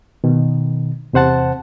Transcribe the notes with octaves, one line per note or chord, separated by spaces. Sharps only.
B2 D#3
E2 C3 C5 F#5 A5